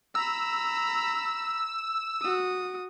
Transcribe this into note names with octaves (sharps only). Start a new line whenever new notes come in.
A#5 B5 E6
F#4 D#6